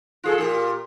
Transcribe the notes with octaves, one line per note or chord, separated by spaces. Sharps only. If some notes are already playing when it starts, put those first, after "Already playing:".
F4 G#4 A4
A#2 G4 A#4